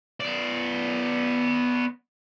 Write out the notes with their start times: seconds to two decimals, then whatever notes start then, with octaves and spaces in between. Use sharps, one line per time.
0.20 B3 D5